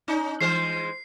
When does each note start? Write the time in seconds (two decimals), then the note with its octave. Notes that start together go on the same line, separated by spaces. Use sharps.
0.08 C#4 D#4
0.41 E3 G#3 C5 C7